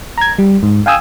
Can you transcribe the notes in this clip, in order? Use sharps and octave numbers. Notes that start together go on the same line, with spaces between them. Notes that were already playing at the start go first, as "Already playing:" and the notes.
A#5 G#6
G3
G#2
F5 G5 G#5 D#6 E6